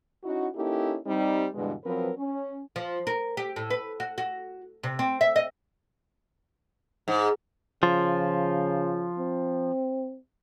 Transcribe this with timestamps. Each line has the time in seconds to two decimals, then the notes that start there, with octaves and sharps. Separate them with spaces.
0.24 C#4 D#4 E4 F#4
0.55 A#3 C#4 D#4 E4 G4 A4
1.06 G3 C4 D#4
1.54 G2 B2 D3 E3 G#3
1.84 F3 F#3 C4 A#4 B4
2.17 C#4
2.76 F3
3.07 A#4
3.37 G4
3.56 A2
3.70 B4
4.00 F#4
4.18 F#4
4.83 C3
4.99 C4
5.21 E5
5.36 D#5
7.08 G#2
7.83 C#3 F3 F4
9.18 C4